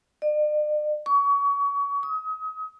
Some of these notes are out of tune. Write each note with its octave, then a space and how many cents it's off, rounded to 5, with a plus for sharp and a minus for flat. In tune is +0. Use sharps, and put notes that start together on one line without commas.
D5 +45
C#6 +30
D#6 +35